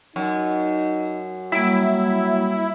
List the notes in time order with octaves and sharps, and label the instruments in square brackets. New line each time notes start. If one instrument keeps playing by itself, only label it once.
[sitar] F#2 [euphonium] D#4
[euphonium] F#3 [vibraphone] G3 A#3 [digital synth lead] E4